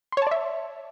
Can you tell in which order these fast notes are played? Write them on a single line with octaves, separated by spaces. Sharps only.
C6 C#5 A5 D5 E5